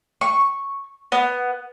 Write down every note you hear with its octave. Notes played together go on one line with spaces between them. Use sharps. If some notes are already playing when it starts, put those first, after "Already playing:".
C#6
B3